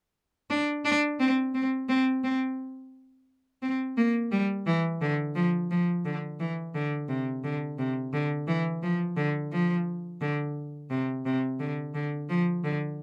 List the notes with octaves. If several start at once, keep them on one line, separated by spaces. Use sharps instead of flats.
D4
D4
C4
C4
C4
C4
C4
A#3
G3
E3
D3
F3
F3
D3
E3
D3
C3
D3
C3
D3
E3
F3
D3
F3
D3
C3
C3
D3
D3
F3
D3